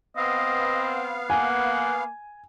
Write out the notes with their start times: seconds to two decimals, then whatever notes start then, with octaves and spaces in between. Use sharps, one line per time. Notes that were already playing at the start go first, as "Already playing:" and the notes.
0.17 B3 C4 D#5 F5
1.30 A#3 F#5 G#5